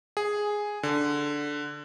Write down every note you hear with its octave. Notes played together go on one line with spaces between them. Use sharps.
G#4
D3